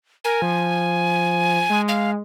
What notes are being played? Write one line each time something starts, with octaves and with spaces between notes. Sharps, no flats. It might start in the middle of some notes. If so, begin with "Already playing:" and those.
A#4 G#5
F3
G#3
F5